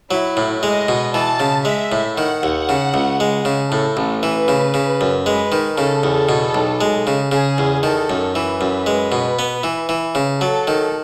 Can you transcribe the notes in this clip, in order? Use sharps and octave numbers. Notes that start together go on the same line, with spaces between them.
F#3 E4
A2
G#3 D#5
B2
E3 A5
C#3
G#3 E5
A2
D#3 F#5
D#2
C#3
C#2
G#3
C#3
A2 A4
A1
E3 B4
C#3
C#3
F#2
G#3 B4
D#3
C#3 A4
E2
B2
B1
G#3
C#3
C#3 G#4
E2
D#3 A4
F#2
E3 B4
F#2
G#3
B2
B3
E3
E3
C#3
F#3 A4
D#3